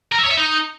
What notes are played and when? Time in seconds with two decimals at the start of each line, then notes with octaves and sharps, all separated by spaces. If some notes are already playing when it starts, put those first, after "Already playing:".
0.12 A#4
0.18 E5
0.25 C#5
0.31 E5
0.37 D#4